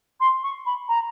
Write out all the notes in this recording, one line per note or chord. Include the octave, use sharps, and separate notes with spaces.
C6
C#6
B5
A#5